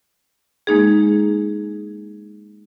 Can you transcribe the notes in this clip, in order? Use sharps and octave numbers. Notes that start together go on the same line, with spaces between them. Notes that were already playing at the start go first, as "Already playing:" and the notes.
G#3 A#3 D#4 G#4